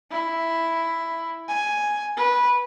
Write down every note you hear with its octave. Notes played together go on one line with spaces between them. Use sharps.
E4
G#5
B4